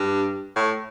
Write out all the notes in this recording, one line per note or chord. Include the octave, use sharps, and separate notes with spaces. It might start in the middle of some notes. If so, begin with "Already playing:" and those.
Already playing: G2
A2